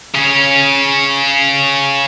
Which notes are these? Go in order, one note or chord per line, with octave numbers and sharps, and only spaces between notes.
C#3 C#4